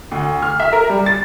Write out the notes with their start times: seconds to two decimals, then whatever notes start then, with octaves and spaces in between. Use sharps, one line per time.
0.11 D2
0.42 F6
0.60 E5
0.73 A#4
0.89 G3
1.06 A6